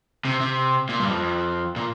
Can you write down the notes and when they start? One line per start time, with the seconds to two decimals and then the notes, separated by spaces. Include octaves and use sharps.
0.25 C3
0.41 C3
0.89 A#2
1.00 G2
1.10 F2
1.76 A#2